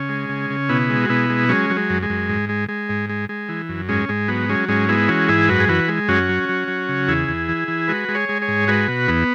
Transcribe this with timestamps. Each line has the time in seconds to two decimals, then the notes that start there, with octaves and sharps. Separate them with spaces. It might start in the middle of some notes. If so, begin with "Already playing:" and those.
Already playing: C#3 C#4
0.09 G#3
0.29 C#3
0.50 C#3
0.69 B2 B3 E4
0.89 G#3
1.03 F#4
1.09 B2 B3 E4
1.30 G#3
1.49 F#3 G#3 C#4
1.70 F#3
1.76 G#3
1.90 F#2
2.03 G#3
2.10 F#2
2.29 G#2
2.49 G#3
2.69 G#3
2.89 G#2
3.10 G#3
3.29 G#3
3.49 E3
3.69 F#2
3.89 G#2 G#3 C#4
4.09 G#2 G#3
4.28 F#3 B3
4.49 F#3 G#3 C#4
4.69 G#2 G#3 C#4
4.89 G#3 B3 E4
5.08 E3 C#4 F#4
5.28 G#2 E4 G#4
5.48 F#2 F#4 B4
5.60 G#4
5.69 E3 F#4 B4
5.88 G#3
6.08 F#2 C#4 F#4
6.29 F#3
6.49 F#3
6.68 F#3
6.89 C#3
7.08 E2 E4 G#4
7.28 E2
7.49 E3
7.68 E3
7.88 G#3 F#4 B4
8.09 G#3
8.15 G#4 C#5
8.29 G#3
8.42 G#4 C#5
8.48 G#2
8.68 G#3 F#4 B4
8.88 B2
9.08 E2 B3